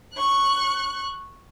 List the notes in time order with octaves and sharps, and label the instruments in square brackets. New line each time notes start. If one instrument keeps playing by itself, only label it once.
[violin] C#6 F#6